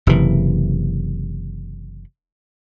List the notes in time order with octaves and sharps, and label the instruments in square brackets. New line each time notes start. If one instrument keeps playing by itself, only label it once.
[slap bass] F#1 C3 E3